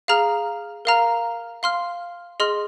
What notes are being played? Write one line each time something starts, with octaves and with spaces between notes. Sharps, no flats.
G#4 F5 A#5 F6
A#4 F5 A#5 F6
F5 C6 F6
G#4 D#5 C6 F6